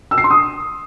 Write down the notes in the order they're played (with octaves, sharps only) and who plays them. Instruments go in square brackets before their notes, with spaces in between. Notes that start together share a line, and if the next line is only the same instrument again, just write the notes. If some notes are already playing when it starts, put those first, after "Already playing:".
[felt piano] E6
C7
C6
D#6